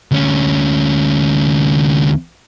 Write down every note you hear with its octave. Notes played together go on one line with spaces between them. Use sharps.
D2 C#4